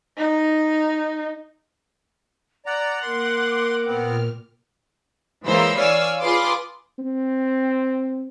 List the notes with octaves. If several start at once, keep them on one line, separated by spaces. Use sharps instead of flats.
D#4
D5 F#5 A#5
A#3 A#4 C6 D6
A#2 B3 C4 F6
E3 G#3 A#3 C5 C#5 E6
C#5 D5 F5 G#5 E6
F4 G#4 B4 C6 D6
C4